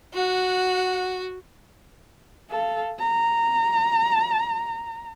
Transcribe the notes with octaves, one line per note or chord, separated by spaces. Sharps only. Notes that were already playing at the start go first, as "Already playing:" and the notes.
F#4 F#5
A4 F5
A#5